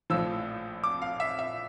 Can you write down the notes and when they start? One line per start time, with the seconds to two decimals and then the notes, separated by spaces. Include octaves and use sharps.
0.10 A#1 A2 F3 E6
0.84 D6
1.02 F5
1.20 E5
1.39 E5